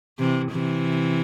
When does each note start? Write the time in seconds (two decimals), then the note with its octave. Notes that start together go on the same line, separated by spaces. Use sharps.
0.19 C3 E3
0.51 C3 E3